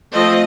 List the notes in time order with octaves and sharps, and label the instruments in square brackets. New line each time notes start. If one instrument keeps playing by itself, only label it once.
[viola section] F3 A3 C4 D#5